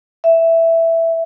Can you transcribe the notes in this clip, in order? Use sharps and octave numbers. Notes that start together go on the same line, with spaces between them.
E5